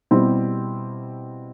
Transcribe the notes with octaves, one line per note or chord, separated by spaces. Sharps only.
B2 G3 C4 E4 G4